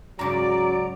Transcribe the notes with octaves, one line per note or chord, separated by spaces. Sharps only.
G#2 C#3 F#3 D5 A#5